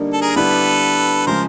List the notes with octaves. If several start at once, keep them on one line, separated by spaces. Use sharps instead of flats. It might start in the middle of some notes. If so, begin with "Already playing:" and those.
Already playing: D3 G3 A#3 D#4
A4
G#4 A#4
D3 G3 B3 E4 G4 A4 B4
C#3 F3 G#3 A#4 C5